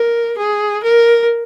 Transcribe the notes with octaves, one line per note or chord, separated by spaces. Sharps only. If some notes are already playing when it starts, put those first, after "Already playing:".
Already playing: A#4
G#4
A#4